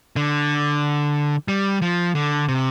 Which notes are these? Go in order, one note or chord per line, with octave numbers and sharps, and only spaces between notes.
D3
G3
F3
D3
C3